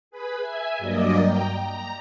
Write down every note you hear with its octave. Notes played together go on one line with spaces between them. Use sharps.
G#4 B4 B5
E5 G#5
G2 F#3 A#3 D5 D#5
G5 A#5
A#5